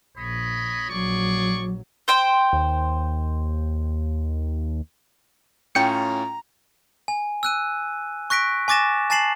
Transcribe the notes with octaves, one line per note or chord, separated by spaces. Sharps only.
A#1 C#5 D#5 B5
A#1 F#3 G#4 D5 C#6
C5 G5
D#2
A2 C#4 F4 G5 A#5 C#7
G#5
E6 F#6 D#7
C#6 F#6 A#6 B6 D7
G#5 C#6 D6 A6 A#6 E7
G#5 A5 A6 C7 E7 F#7